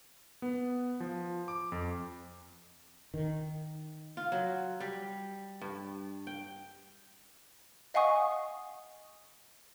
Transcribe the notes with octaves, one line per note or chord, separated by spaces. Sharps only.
B3
F3
D6
F2
D#3
F4
F#3
G3
G2
G5
D#5 F5 F#5 G#5 C#6 D#6